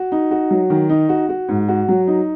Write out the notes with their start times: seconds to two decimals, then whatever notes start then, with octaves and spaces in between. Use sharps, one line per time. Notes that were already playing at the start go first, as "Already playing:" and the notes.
Already playing: F#4
0.12 D#4
0.31 F#4
0.51 F#3
0.70 D#3
0.89 D#4
1.09 F#4
1.29 F#4
1.49 G#2
1.68 F#4
1.88 F#3
2.07 D#4